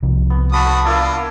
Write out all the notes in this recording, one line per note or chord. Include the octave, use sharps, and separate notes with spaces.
C2 C3 F3
B3
F#4 A4 A5 B5 D6 D#6
A#3 D4 E4 F4